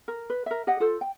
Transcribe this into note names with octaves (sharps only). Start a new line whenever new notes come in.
A#4
B4
A#4 E5
G4 D#5 F#5
F4 A4 C5
G5